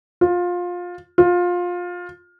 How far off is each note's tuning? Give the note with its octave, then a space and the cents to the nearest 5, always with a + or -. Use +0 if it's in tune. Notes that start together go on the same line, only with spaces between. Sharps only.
F4 +20
F4 +20